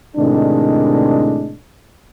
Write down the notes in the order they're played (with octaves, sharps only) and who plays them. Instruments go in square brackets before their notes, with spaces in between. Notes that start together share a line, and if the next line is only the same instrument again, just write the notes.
[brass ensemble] A2 C3 D#3 G#3 D4